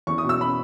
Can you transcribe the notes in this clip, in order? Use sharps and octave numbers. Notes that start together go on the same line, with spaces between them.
E2 C#6
D#6
B2 E6
B5